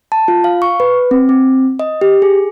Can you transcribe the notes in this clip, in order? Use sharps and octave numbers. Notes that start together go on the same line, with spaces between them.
A5
F4
F5
C#6
B4
C4
C4
D#5
G4
G#4